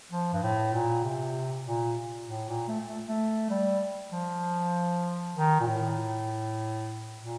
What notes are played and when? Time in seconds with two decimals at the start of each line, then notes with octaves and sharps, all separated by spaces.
0.12 F3
0.33 G2
0.43 A2
0.74 A#2
1.04 C3
1.65 A#2
2.27 A2
2.48 A#2
2.68 A3
2.88 A3
3.08 A3
3.50 G3
4.12 F3
5.35 D#3
5.60 A#2
5.67 A2
7.20 A#2